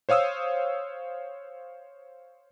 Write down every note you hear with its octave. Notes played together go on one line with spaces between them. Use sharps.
C5 C#5 F5 D#6 E6